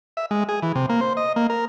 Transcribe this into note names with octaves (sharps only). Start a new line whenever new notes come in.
E5
G#3
G#4
E3
C3
A#3
C5
D#5
A#3
A#4